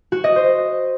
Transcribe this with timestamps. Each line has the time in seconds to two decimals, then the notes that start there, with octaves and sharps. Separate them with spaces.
0.12 F#4
0.24 D#5
0.36 C5